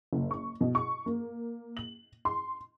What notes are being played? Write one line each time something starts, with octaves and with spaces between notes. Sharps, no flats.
F#1
C#6
B2
C#6
A#3
F#7
C6